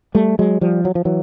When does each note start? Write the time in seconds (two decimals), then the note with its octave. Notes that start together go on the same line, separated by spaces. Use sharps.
0.15 G3 A3
0.39 F#3 G#3
0.61 F3 G3
0.85 F#3
0.95 F3
1.05 E3 F#3